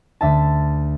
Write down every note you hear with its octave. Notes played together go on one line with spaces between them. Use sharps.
D2 E5 A5